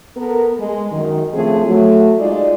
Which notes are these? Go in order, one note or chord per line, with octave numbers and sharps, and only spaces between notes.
B3 A4 A#4
G#3
F#2 D#3
C#3 F3 A3 C4 G#4
F#3 A3
G#3 D#4 F4 D5